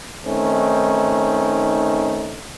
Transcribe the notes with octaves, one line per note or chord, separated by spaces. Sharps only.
D#3 A3 C4 C#4 D#4